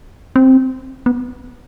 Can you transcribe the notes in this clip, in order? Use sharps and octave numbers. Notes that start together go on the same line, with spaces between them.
C4
B3